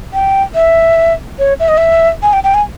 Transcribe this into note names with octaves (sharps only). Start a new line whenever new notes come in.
G5
E5
C#5
E5
D#5
E5
G#5
G5
G5
G#5